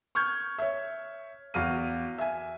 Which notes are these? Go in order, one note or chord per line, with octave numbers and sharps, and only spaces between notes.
C#6 F6 G6 G#6
C#5 E5
E2 F#4 F5 F6 D#7
E5 G#5